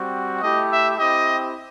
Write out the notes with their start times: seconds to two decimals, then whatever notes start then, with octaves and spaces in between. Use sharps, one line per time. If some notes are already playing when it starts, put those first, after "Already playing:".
Already playing: G3 C4 F#4
0.41 A3 E4 G4 D#5
0.69 E5
0.97 C4 E4 G4 D#5